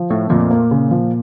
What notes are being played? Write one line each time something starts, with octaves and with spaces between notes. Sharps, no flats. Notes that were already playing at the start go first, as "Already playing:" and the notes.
Already playing: F3
A2 A3
F2 A#2
A#3
C#3
F3